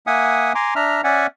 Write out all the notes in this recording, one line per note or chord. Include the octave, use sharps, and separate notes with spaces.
A#3 E5 F#5 G#5 D#6
G#5 A#5 C6 D6
D4 E5 A#5 F6
C#4 D5 E5 F#5 G#5